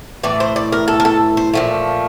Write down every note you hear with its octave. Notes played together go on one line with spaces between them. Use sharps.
A2 E3 D5
C5
D5
A#4
A4
A#4
A4
C5
A#2 F3 A3